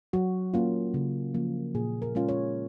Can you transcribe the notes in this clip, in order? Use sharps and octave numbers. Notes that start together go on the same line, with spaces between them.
F#3 F#4
A#3 C#4 F4
C#3
F3 A#3
A#2 G#4
A#4
G#3 C#4 F4
C#5